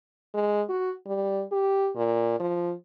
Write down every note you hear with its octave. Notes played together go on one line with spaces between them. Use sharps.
G#3
F#4
G3
G4
A#2
F3